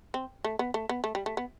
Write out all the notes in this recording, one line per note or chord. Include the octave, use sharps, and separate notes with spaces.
C4
A3
B3
A3
B3
A3
G3
A3
B3